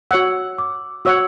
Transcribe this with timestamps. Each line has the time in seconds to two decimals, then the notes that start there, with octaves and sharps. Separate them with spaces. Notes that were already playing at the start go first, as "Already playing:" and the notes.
0.11 F#4 C#5 F#5 E6
0.58 D6
1.05 F#4 C#5 F#5 E6